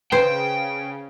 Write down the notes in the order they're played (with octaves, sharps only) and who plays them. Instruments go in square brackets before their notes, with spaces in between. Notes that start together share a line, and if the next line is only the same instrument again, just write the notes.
[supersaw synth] C#3 [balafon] B4 [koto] C5 [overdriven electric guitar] G5